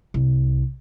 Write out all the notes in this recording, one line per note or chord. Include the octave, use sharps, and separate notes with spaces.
C2